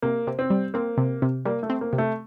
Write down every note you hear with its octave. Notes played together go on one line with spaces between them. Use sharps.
C3 A#3
C3
C4
G3
A#3 C4
C3
C3
G3 A#3
A3
C4
A#3
C3
A3